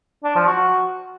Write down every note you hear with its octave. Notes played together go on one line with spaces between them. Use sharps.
D4
F3
F#4